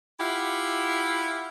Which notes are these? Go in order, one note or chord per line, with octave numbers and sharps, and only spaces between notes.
E4 F4 G4 E5 F#5